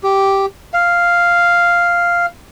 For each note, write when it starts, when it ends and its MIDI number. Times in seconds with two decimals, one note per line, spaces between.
0.03 0.46 67
0.74 2.26 77